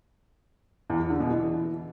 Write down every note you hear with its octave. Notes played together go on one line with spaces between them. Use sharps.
E2
E3
D3
B2
E3